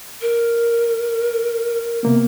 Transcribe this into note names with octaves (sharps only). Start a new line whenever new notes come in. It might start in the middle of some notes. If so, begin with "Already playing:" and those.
A#4
C3 A#3 B3